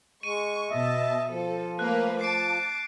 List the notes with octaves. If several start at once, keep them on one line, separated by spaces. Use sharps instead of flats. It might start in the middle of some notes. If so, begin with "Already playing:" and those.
G#3 C#6 D#7
B2 D#5 E5 A5
F3 A4
A3 A#3 B4 F#6
A5 D6 C7 D7